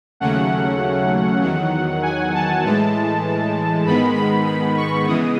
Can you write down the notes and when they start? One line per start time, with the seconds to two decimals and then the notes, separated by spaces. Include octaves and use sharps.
0.20 D#2 C#3 F#3 A3 C#4 F#5
1.41 E2 D#3 F#3
2.03 G#5
2.34 A5
2.63 A2 E3 G#3
3.85 G#2 D#3 G#3 B3 B5
4.15 B5
4.46 B5
4.77 C#6
5.07 C#3 E3 G#3 B3 D#6